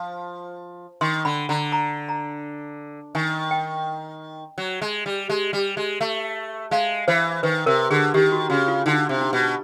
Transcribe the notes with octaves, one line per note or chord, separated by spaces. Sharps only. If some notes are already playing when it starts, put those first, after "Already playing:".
Already playing: F3
D#3 C6
D3 B5
D3 A#5
A#5
A#5
D#3 G#5
G5
F#3
G#3
G3
G#3
G3
G#3
A3
G#3 F5
E3 C5
D#3 B4
C3 A#4
D3 G#4
D#3 G4
F#4
C#3 F#4
F4
D3 D#4
C3
D4
B2